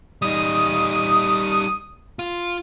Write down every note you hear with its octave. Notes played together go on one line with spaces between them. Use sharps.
G3 D#4 D#6
F4